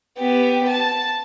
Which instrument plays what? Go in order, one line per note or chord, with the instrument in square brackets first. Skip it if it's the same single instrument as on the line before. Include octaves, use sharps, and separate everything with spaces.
[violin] B3 G4
A5